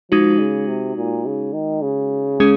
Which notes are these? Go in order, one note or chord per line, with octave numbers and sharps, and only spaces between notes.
F3 G#3 D#4 F#4
C#3
C3
A#2
C#3
D#3
C#3
G#3 C#4 G#4